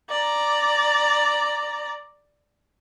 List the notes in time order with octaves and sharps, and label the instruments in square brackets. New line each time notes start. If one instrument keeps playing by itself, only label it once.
[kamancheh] D5 A#5